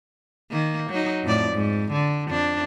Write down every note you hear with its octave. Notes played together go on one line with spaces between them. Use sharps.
D#3 A#3
F#3 D#4
F2 A2 D5
G#2
D3
F2 D4